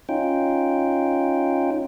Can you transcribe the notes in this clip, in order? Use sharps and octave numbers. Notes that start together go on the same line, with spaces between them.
C#4 D#4 F4 G5